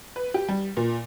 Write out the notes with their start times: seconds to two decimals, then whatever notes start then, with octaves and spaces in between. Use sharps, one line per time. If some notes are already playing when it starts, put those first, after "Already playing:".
0.16 B4
0.34 G4
0.48 G3
0.77 A#2